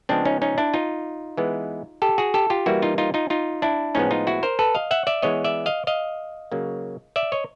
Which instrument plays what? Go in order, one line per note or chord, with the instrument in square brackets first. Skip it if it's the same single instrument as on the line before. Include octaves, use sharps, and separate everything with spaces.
[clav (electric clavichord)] C#3 F3 G#3 B3 C4 D4
C#4 D#4
C#4 D#4
D4 E4
D#4 F4
E3 G#3 B3
G4 A4
F#4 G#4
G4 A4
F4 G4
E3 G3 A#3 E4 F#4
D#4 F4
D#4 F4
D#4 F4
D#4 F4
D4 E4
A2 F3 G#3 B3 C#4 D#4
D#4 F4
E4 F#4
A#4 C5
A4 B4
D#5 F5
E5 F#5
D5 E5
E3 G#3 B3 C#5 D#5
D5 E5
D#5 F5
D#5 F5
C#3 F#3 A#3
D5 E5
C#5 D#5